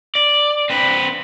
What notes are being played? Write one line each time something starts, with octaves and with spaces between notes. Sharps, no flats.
D5
C4 B4